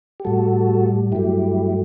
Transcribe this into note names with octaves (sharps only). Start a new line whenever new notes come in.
G4
A2 G3 F#4 A4
G2 F#3 A3 E4 G4